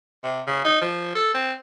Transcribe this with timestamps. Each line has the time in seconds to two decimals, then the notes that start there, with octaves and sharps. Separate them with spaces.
0.23 C3
0.47 C#3
0.65 D#4
0.82 F3
1.15 A4
1.34 C4